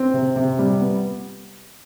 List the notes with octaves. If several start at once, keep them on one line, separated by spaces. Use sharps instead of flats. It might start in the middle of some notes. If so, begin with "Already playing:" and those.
Already playing: C4
C3
C3
G3
B3